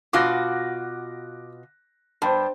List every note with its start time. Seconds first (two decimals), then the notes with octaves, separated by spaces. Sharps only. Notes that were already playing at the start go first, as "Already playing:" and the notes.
0.13 B2 F4 F#4 D6 F#6 A#6
2.22 G2 C5 G5 A5